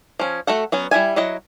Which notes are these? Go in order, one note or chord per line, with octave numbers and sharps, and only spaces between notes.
F3 C#4
A3 F#4 A4 F#5
F#3 B3 C#4
G3 E4 E5 G#5
F#3 E4 D#5 F#5